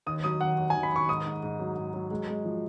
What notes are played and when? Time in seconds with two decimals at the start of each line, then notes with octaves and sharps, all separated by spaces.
0.06 D#2 D#6
0.23 F#3 D#6
0.41 D#2 F#5
0.58 D#2
0.70 G#5
0.75 D#2
0.83 B5
0.92 D#2 C#6
1.09 G#2 D#6
1.25 G#2
1.43 G#2
1.60 F#3
1.77 G#2
1.94 F#3
2.11 G#3
2.28 G#3
2.45 F3